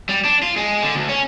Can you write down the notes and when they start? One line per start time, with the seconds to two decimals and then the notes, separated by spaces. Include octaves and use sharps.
0.09 G3
0.25 D4
0.43 F4
0.56 G#3
0.83 D3
0.95 D2
1.09 C#4